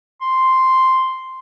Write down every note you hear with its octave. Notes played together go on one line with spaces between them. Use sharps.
C6